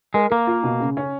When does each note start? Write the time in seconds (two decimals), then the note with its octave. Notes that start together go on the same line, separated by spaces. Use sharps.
0.14 G#3 A#4
0.31 A#3 A#4
0.47 F4
0.63 B2
0.80 C#3
0.97 C#4